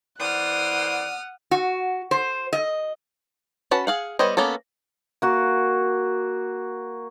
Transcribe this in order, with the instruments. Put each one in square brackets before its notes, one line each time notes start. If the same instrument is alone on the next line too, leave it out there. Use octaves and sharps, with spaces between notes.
[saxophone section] E3 C5 D5 [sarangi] F#5 [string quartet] D#6 F6
[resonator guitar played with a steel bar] F#4
C5
D#5
[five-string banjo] C#4 F#4 B4 A5
G#4 F5 F#5
G3 B3 C5 C#5 D#5
A#3 B3 C#4 A4
[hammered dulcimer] A#3 F#4